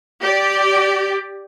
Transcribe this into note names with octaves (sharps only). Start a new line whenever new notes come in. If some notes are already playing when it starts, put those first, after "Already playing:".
G4 D5